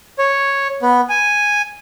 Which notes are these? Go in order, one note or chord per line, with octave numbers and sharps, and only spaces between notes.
C#5
B3
G#5